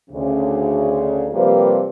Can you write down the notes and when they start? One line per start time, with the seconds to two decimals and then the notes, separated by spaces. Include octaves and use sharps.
0.10 D2 C#3
1.31 C3 F3 G3 A#3 G4 B4